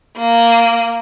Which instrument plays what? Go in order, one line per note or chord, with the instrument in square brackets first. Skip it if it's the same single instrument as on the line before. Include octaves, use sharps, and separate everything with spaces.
[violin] A#3